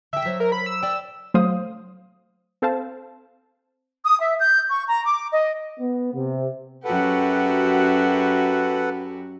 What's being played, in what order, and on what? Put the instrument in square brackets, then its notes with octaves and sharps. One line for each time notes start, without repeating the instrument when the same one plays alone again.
[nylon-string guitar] D3 G5 [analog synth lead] E5
[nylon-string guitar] F#3 C5 C#5
[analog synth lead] A#4
B5
E6
[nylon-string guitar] D5 G5
[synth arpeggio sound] F#3 A3 C5 F5 D#6
C4 A4 C5 F5 A5
[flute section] D#6
E5
G6
C#6
A#5
D6
D#5
[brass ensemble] B3
C3
[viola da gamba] F#2 F#4 G4 [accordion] A4 B4 F#5